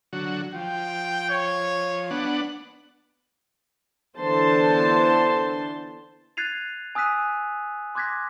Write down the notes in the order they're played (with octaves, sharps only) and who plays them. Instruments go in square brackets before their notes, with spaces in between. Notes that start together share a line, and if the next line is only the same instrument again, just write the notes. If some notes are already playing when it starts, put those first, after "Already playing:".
[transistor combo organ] D3 F#3 F#4
[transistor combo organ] F3 [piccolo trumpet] G5
[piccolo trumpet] C#5
[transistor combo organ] B3 D4 F#5
[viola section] D3 E3 B3 C5 A5 C6
[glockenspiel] F#6 G#6 A6 C7 D#7 F7
G#5 D#6 E6 F#6 B6 D#7
C6 D6 F#6 G#6 A#6 B6